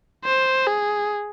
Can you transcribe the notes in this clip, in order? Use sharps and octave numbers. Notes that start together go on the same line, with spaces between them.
C5
G#4